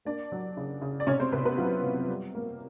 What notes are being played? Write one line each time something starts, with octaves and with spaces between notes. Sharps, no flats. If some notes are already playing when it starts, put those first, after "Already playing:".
A#3 D4 D5
F#3
C#3
C#3
D5
C3 C#4 C#5
C4 C5
C3 B3 B4
B3 B4
F#3 F4
F#3
G3
A#3